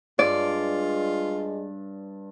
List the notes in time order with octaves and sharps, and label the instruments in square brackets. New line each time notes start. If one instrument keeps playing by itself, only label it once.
[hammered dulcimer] G2 [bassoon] G#3 [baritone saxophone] F4 [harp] D5